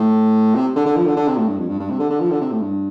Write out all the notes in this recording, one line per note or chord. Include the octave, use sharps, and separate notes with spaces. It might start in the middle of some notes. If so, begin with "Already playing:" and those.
Already playing: A2
C3
D3
D3
F3
D3
D3
C3
A2
G2
F2
G2
G2
C3
D3
D3
F3
D3
C3
A2
G2